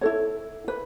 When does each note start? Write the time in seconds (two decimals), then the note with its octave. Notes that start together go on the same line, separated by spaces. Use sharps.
0.01 E4 A4 C#5
0.68 B4